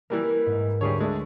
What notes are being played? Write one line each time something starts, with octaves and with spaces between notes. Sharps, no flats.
E3 G3 A#3 A#4 B4 F#6
G#2
D2 G3 G#4 C#5 C#6
G#3 A3 D4